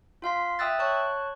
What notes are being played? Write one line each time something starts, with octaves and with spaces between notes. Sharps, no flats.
F4 F5 C6 B6
E5 G5 D#6 E6 F#6 A6
C#5 A5 C#6 F#6